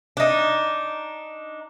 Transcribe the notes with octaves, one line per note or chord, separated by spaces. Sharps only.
D4 D#4